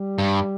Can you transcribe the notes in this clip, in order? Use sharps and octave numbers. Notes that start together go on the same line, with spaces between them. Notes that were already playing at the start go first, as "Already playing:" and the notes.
Already playing: G3
G2